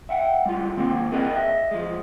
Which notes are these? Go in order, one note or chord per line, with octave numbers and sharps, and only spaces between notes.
E5 F#5 G5
G3 G#3 F4
D#3 A#3 C4
G#4 A#4 B4 D5 D#5 G5
D#5 E5
F3 G#3